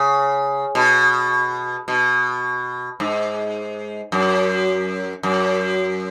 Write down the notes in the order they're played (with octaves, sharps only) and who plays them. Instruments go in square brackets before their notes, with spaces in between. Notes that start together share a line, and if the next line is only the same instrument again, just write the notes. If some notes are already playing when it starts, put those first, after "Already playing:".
Already playing: [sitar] C#3
B2
B2
G#2
F#2
F#2